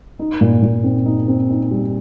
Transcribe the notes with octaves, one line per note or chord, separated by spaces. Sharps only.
D#4
A#2
A#2
C4
D#4
C4
D#4
G3